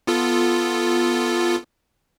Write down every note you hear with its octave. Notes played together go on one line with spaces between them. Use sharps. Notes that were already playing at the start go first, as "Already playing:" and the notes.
B3 F4 A4